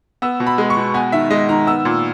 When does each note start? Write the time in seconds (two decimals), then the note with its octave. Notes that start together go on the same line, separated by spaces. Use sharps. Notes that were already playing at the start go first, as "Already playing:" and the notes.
0.22 B3 E6
0.40 B2
0.47 B5
0.58 G#3
0.70 C#6
0.77 B2
0.94 B3 G#5
1.12 D#3 E5
1.30 G#3 D#5
1.49 D#3 A#5
1.67 B3 E6
1.85 A#2